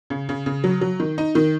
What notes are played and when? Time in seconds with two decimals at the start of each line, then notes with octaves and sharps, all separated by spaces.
0.10 C#3
0.29 C#3
0.46 C#3
0.64 F#3
0.81 F#3
1.00 D#3
1.18 D#4
1.35 D#3